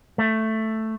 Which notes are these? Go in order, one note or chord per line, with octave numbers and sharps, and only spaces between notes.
A3